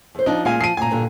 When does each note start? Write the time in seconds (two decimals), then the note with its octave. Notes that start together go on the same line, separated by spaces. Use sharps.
0.15 E2 C5
0.26 F3 D4 D#4
0.45 A#2 G#3 F5 G#5
0.61 F3 C7 D#7
0.77 D2 A#2 G#5 A#5
0.90 G2 A#2 D3